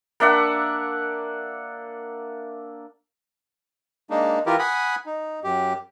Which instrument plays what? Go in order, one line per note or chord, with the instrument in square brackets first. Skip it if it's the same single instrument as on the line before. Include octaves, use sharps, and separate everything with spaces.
[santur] A#3 D4 E5 F#5
[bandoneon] G#3 A#3 D4 D#4
E3 E4 F4 G4 A#4
F#5 G#5 B5 D#6
D#4
F#2 G4